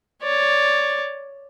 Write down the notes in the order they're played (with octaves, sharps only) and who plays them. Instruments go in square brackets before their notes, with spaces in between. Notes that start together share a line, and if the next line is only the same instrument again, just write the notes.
[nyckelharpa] C#5 D5